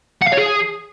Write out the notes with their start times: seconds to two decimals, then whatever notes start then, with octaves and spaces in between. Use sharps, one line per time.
0.22 F#5
0.27 F5
0.33 C#5
0.38 G#4